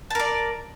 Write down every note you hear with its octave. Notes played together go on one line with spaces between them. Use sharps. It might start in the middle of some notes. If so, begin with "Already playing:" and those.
A#4 D5 A5